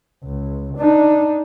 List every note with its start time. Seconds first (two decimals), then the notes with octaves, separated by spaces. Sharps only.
0.24 C#2
0.78 D4 D#4